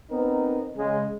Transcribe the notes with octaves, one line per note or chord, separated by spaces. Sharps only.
B3 C4 D#4 A#4
C#3 G#3